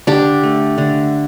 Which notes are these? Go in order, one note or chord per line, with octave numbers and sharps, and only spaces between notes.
D3 D4 G4
A3
D3